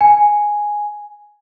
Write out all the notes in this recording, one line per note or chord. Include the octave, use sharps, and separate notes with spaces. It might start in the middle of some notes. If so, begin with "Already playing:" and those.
G#5